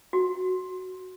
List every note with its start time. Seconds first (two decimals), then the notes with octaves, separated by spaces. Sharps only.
0.13 F#4